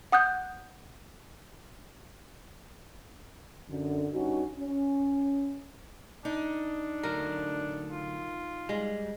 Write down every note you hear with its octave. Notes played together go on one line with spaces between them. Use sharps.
F#5 D#6 F#6 G6
F#2 D3
G2 C#4 D#4 F#4
C#4
D4 D#4
D3 F#3 A3 A#4
F4
G3 G#3